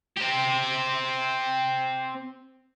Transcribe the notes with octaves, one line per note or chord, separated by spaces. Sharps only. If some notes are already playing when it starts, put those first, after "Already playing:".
C4 G4